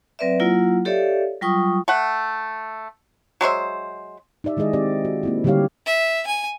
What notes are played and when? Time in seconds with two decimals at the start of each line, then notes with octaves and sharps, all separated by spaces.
0.19 F#3 C4 B4 D5 E5
0.40 F#3 A#3 E4 F4 F#5
0.85 G4 A4 C#5 D5 E5 F5
1.42 F#3 G3 F4 G5 C#6 D#6
1.88 A3 F#5
3.41 F#3 G#3 C5 E5
4.44 D#4 G4 D5 E5
4.57 D#3 G#3 E4 G#4 D#5
4.73 C4 G4 D5
5.05 F#4
5.23 A#3 C4 E4
5.44 D3 G3 D#4 G4 C#5 F5
5.86 E5
6.27 G#5